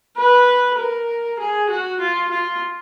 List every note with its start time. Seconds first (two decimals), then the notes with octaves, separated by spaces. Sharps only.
0.17 B4
0.79 A#4
1.40 G#4
1.70 F#4
2.01 F4
2.31 F4